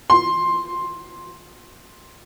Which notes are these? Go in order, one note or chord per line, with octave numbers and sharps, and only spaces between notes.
C6